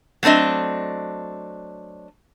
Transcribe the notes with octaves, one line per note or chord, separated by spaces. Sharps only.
F#3 A3 C4 D4 D#5